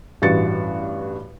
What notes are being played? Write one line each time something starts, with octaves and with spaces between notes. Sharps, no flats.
A1 G2 E3 F#4 A6 C#7